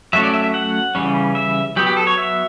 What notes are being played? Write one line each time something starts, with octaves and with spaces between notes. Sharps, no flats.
F#3 A3 C#4 E5
D5
E5
E5
F#5
C#3 E3 G3 C#4
E5
F#3 B3 G4
G4
A4
C#5
E5